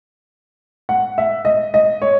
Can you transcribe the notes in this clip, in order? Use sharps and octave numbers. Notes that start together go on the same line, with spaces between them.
F#5
E5
D#5
D#5
C#5